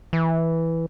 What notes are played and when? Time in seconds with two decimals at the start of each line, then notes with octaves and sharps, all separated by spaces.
0.13 E3